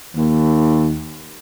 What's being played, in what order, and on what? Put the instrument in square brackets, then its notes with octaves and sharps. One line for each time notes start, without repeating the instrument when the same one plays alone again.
[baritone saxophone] D#2